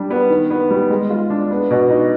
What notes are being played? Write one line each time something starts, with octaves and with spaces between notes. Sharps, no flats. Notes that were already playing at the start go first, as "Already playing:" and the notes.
Already playing: G3 D4
B3
D#3
B3
G3
G#3
F4
D4
B3
B2
D#4